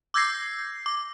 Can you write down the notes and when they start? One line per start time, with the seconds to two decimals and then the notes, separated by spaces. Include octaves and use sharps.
0.14 D6 E6 G6 G#6 A#6 C7
0.86 D6